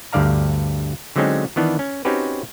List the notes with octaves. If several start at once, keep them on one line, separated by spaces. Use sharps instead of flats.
D2 G2 D3 D5 F5 A#5
D3 F#3 G#3 C4 C#4 D#4
D#3 E3 B3 D4
C#4
C4 C#4 D#4 F#4 G4 B4